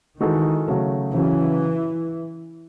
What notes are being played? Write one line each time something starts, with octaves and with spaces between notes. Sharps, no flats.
D#3 E3 G#3 D#4 F#4 A4
C#3 F#3 A3
C#3 E3 F#3 C#4